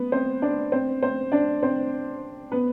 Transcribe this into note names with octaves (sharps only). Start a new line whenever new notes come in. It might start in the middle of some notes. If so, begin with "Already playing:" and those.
Already playing: B3 B4
C4 C5
D4 D5
C4 C5
C4 C5
D4 D5
C4 C5
B3 B4